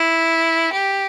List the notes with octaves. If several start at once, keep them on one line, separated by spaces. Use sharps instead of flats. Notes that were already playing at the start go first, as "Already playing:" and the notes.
Already playing: E4
G4